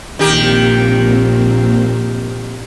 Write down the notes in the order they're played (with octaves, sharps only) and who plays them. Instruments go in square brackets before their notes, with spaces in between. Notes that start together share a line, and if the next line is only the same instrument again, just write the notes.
[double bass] A#1 [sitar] D#3 G4 [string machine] A#3 C4